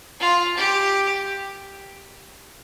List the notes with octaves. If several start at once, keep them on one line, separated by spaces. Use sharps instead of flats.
F4
G4